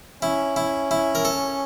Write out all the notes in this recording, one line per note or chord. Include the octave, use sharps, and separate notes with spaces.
C#4 E4
E4
E4
A#4
A4